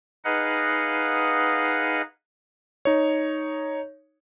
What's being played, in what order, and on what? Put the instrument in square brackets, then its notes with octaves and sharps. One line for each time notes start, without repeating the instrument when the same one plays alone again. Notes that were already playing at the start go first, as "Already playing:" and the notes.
[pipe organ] D#4 G#4 B4 D#5 F5 F#5
[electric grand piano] D#4 C#5